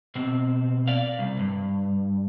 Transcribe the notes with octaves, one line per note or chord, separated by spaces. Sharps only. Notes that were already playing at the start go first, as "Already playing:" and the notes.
B2 C4
D5 F5
C2
G2